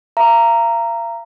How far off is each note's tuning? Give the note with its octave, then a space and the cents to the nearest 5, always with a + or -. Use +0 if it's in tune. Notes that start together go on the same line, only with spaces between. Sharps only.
F5 -45 A#5 -5